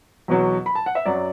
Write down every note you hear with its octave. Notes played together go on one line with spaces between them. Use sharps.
E2 B2 F#3
B5
A5
F#5
E5
F#2 F#3 D5